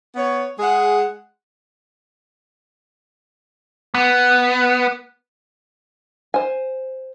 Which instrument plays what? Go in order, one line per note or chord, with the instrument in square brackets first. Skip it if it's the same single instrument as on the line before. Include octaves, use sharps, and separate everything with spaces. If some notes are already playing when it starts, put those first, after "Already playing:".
[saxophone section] B3 C#5
G#3 G#4 F#5
[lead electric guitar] B3
[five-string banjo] C5 G#5